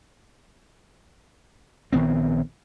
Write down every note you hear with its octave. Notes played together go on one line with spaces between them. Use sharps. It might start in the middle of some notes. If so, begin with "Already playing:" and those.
A#1 D#3 B3 C4